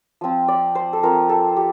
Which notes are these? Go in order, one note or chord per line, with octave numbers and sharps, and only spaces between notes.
F3 C4 F4
D5
C5
A4
F3 C4 F4 A#4
A4
G4